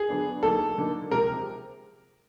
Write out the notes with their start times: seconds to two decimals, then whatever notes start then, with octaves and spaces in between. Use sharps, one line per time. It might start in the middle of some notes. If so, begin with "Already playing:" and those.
Already playing: G#4
0.09 D3 F#3 B3 D4
0.43 D3 F#3 A#3 D#4 A4
0.77 D3 F#3 A#3 D#4
1.11 C3 F3 G#3 A#4